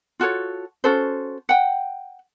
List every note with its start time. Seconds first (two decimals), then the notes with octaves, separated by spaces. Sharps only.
0.20 F4 F#4 A4 C#5
0.84 C#4 F#4 A4 C5
1.49 F#5 G5